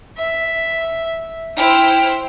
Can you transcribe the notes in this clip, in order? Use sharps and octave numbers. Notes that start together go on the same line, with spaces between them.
E5
E4 C5 G5 F6